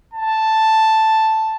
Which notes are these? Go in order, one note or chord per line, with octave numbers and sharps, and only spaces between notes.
A5